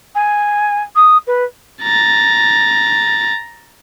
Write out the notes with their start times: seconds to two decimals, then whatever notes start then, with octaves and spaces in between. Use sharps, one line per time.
0.15 G#5
0.95 D#6
1.27 B4
1.82 A#5 A6